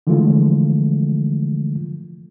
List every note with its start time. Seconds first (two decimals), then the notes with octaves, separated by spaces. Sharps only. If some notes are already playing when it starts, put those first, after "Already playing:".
0.07 D3 E3 F3 G#3 A3 F4